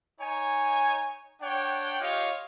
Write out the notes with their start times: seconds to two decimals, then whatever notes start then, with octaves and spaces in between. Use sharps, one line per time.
0.20 D#4 C#5 G#5
1.42 D4 C#5 F#5 G5
2.00 F4 G4 C#5 D#5 F5